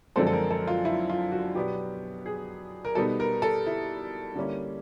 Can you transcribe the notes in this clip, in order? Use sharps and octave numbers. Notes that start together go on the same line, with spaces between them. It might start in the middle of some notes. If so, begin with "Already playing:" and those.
F#2 D3 F3 G#3 C4 A4
A4
A#4
A4
F4
E4
F4
F#4
B2 F#3 B3 D4 G4
G#4
A#4
B2 G3 B3 D#4 A4
A#4
A4
E4
D3 G3 A#3 C#4 E4